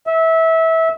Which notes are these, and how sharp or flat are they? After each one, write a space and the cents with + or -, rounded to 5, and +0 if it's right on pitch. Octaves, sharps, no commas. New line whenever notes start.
E5 -20